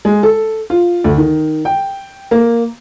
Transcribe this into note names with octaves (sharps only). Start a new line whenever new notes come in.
G#3
A4
F4
D2
D#3
G5
A#3